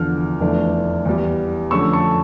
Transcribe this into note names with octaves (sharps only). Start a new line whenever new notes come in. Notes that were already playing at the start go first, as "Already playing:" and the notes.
Already playing: E2 D3 F3 F6
F1 E2 E3 A3 D4
E2 E3 G3
F2 D3 A3 C#4 C#6 E6
A5 C#6